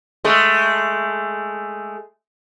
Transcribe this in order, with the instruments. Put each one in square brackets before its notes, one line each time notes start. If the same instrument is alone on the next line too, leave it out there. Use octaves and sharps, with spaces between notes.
[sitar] G#3 A3